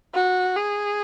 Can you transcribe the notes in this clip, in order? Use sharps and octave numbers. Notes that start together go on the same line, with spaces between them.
F#4
G#4